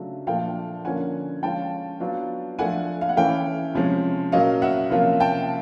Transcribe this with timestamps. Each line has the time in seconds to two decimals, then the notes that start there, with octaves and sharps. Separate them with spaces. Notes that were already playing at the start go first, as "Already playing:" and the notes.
Already playing: C#3 F#3 A3 D4 F4
0.27 A#2 F3 A3 D4 F5 G5
0.85 D3 F3 A#3 C#4 F4 F#5 G#5
1.42 F3 G#3 C#4 F4 G5 A5
2.00 F#3 B3 D4 F4
2.59 F3 A3 D4 F4 F#5 G#5
3.01 F5
3.09 F#5
3.17 E3 A3 C#4 F5 G5
3.75 C3 F3 G#3 C#4
4.32 A#2 F#3 A#3 C#4 D#5 F5
4.62 E5 F#5
4.90 C3 F3 A#3 C#4 F4
5.20 G5 A5